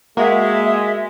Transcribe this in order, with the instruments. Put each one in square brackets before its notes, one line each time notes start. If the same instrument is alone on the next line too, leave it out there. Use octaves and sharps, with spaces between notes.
[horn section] G#3 [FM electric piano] A#3 F#4 [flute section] E5